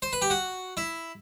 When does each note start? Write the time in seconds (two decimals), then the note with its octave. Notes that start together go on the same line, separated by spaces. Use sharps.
0.02 C5
0.13 B4
0.22 G4
0.30 F#4
0.77 E4